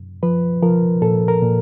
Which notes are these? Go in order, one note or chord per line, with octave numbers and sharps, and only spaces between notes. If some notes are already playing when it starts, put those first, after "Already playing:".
Already playing: F#2
F3 B4
F3 A#4
A#2 A4
A#4
A#2